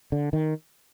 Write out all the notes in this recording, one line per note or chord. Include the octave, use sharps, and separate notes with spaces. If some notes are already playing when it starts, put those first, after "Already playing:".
D3
D#3